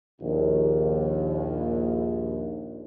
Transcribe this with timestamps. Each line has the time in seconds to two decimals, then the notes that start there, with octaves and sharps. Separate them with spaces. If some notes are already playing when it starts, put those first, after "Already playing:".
0.20 A#1 D#2